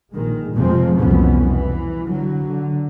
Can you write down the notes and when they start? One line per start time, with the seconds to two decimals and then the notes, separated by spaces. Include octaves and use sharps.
0.12 A#1 D#3 G#3
0.53 F1 F2 C3 F3 G#3 C4
0.96 C2 F2 B2 E3 B3 C#4
1.46 E3
2.06 D3 F#3
2.47 D3